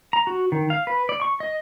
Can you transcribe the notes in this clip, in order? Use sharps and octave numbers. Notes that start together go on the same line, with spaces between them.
A#5
F#4
D#3
F5
B4
D5
C#6
D#5